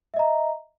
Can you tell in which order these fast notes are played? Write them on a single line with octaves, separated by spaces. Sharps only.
E5 D#5 A#5